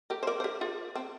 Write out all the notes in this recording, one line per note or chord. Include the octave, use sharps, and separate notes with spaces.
G4 A#4
C5
A#4 D5
C5
G4 A#4
F4 G#4
C4